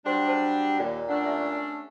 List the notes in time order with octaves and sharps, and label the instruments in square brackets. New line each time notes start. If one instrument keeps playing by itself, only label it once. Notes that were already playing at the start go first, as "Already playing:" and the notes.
[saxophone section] F#3 G3 D4 [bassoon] G4 [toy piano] G#4 C5 C6
[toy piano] G#4 C5 A5
[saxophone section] D#2 [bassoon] A#2 [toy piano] F4 D5 G5
[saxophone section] A3 C#4 D4 [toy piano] F#5
[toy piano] G4 E5